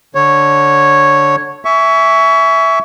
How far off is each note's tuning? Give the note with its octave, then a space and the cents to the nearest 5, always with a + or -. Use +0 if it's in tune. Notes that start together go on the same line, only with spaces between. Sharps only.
D3 +0 C#5 -5
E5 +0 G#5 +0 C#6 +25